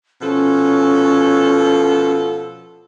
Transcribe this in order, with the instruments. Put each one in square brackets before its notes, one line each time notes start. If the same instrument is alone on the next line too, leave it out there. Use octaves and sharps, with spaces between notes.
[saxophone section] B2 F3 A4 [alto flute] C#4